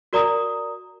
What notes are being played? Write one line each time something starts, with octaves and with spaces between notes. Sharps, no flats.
F#4 A#4 D5 A#5 D#6